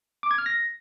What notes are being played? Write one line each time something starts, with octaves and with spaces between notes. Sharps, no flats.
D6
G#6
F6
A#6